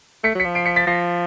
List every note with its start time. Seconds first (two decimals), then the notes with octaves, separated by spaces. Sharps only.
0.24 A3 B6 C#7
0.35 F#3 B6 C#7
0.45 F3
0.55 C7 D7
0.66 B6 C#7
0.76 A6 B6
0.87 F3 A#6 C7